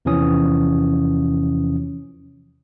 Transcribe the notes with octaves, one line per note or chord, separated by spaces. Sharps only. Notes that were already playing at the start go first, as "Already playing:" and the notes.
E2 C3 E3 F3 C#4 D#6